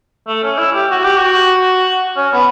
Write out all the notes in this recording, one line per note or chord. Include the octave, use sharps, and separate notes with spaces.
A3
C#4
E4
G4
F#4
G4
F#4
C#4
B3